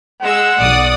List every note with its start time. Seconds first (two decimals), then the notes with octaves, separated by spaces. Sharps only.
0.22 G#3 F#5 E6
0.59 B1 D5 D#6